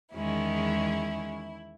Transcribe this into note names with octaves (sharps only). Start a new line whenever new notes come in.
E2 D#3 G#3 C#4 E4